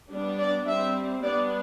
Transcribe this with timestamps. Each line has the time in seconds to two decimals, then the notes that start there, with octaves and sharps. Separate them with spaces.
0.10 G3 B3 D4
0.39 D5
0.66 G3 C4 E5
1.23 G3 B3 D4 D5